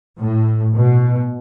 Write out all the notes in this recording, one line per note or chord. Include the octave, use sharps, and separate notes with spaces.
A2
B2